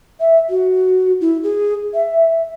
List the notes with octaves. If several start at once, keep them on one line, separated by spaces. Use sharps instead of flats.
E5
F#4
E4
G#4
E5